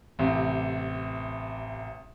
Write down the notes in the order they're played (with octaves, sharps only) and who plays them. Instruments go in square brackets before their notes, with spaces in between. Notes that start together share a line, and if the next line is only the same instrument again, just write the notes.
[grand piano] A1 C3